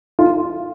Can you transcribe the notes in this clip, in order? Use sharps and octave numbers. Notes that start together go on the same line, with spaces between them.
F4